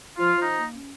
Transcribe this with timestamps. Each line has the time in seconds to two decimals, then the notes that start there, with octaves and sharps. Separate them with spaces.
0.18 F3 F4
0.36 F3
0.42 D#4
0.53 A#3
0.71 C#4